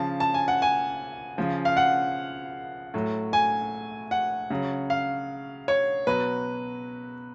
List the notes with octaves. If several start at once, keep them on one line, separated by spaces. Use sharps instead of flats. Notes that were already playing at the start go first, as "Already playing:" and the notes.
Already playing: C#3 F3 A5
A5
G#5
F#5
G#5
C#3 F3
F5
F#5
A2 F#3
G#5
F#5
C#3 F#3
F5
C#5
B2 F#3 B4